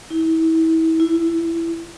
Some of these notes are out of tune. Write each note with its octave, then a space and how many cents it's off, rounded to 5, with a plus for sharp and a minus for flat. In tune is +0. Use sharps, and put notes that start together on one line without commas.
E4 -30
E4 +15